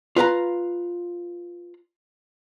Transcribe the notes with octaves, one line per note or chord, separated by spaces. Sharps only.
F4 B4 F5 A#5